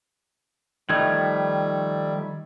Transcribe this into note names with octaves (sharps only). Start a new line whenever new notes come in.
D#3 F3 G3 A3 D#5 G#6